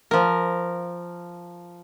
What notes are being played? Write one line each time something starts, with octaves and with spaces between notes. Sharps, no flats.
F3 A#4